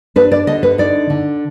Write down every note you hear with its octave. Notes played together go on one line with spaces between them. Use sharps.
D4 B4
D5
D3 D#5
B4
D#4 D5
D3